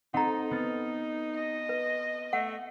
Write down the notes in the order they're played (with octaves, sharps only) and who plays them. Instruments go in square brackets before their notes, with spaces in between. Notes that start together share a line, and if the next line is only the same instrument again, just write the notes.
[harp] C4 A4 [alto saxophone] D#4 [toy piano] F#5 A#5
[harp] B3 F6 A6
[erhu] D#5
[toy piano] B4
[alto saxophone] A3 [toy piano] F#5